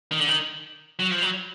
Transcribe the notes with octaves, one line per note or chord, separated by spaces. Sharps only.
D#3
D3
D#3
F#3
F3
F#3